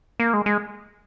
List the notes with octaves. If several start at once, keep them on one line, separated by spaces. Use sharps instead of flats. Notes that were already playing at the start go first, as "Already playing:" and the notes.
A#3
G#3
G#3